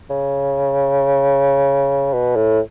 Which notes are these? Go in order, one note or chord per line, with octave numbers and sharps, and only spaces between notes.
C#3
B2
A2